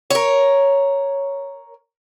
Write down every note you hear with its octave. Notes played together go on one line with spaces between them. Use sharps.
A#4 C#5